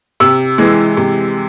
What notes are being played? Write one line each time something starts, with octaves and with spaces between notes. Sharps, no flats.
C3 E6
E3 G#3
C3